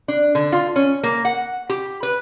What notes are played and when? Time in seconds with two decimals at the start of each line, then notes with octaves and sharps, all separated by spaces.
0.08 D4
0.35 D3
0.52 F4
0.76 C#4
1.04 A#3
1.25 F#5
1.70 G4
2.03 B4